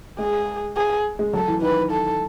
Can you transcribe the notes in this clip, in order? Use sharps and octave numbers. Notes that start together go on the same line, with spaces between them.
G#3 G#4
G#4
G#3
F#3 A4
E3
D#3 B4
A4